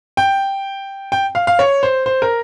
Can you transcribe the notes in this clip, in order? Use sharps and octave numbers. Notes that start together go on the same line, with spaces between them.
G5
G5
F5
F5
C#5
C5
C5
A#4